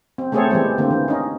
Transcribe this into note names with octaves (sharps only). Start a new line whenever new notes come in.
C4
A3 B3 C4 G#4 A4 C#5
E3 G3 G#3 C4
D3 A#3 C4
E3
C#4 D#4